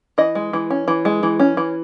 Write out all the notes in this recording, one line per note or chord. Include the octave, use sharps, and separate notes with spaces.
E3 D#5
G#3
E3
C#4
E3
G#3
E3
C#4
E3